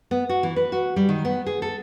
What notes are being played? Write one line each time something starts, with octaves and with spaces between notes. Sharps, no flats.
B3
F#4
E3
B4
F#4
G3
D#3
B3
G#4
A4